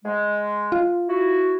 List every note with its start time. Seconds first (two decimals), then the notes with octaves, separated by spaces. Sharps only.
0.05 G#3
0.72 F4
1.09 E4 F#4